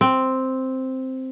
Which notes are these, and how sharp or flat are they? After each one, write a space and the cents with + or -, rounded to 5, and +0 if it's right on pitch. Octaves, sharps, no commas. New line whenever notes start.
C4 +0